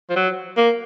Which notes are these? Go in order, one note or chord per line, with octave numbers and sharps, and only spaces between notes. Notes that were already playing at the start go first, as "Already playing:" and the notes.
F3
F#3
A#3